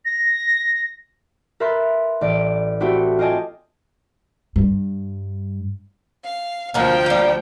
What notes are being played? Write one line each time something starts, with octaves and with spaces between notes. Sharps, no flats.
A#6
A#4 B4 E5 C6 F#6 A6
A1 D5
A3 C4 E4 F#4 G4
F4 G4 D#5 G#5 A5
G2
F5
D2 B2 F3 A#3 F#5 G5
G3 A#3